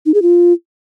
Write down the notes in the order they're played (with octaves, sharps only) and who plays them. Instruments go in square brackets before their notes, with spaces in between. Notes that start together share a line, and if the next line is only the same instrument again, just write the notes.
[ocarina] D#4
G#4
F4